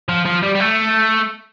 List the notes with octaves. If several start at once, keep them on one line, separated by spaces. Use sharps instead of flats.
F3
F3
G3
G3
A3